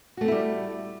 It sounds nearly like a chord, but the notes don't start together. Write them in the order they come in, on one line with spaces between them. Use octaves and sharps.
F#4 A3 C4 E4 G3